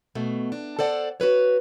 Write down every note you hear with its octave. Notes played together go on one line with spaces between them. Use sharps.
B2 A3
D4
A4 C5 D5 F#5
F#4 A4 B4 C#5